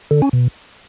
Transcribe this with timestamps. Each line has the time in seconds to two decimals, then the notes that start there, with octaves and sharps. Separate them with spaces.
0.11 D3
0.22 C#4
0.33 B2